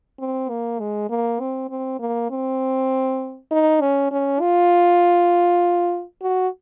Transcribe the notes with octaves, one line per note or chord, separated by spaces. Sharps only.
C4
A#3
G#3
A#3
C4
C4
A#3
C4
D#4
C#4
C#4
F4
F#4